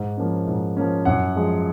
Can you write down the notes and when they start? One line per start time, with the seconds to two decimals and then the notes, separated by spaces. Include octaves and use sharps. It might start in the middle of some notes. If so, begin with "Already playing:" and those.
Already playing: G#2
0.17 F3 A#3 C#4
0.47 G#2
0.77 F3 A#3 C#4
1.05 F#2 F#5
1.36 F3 G#3